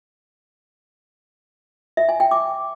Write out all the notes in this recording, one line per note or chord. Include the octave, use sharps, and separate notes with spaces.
E5
G#5
G5
D6